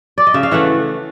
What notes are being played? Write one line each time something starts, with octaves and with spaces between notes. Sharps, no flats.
D5
D#5
C#3 E5
F5
E3 A3 E5 F#5